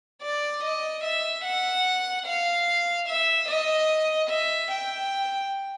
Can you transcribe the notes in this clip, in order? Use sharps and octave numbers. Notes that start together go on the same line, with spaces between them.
D5
D#5
E5
F#5
F5
E5
D#5
E5
G5